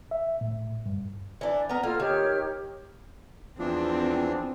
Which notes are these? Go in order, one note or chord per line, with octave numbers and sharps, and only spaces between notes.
E5
A2
G2
E3 D4
B3 A#4
A#3 F4 A4 F6
D#3 G4 C#5 F6
E2 E3 F3 C4 D4